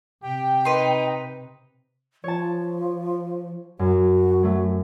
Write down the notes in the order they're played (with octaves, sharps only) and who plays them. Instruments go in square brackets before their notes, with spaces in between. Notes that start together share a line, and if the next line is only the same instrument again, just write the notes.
[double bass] C3 [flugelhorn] G4 [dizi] G5
[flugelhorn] D#4 [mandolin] B4 C6
[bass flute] F3 [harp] C#5 A5
[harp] F#2 [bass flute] F#4
[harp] F#3 A3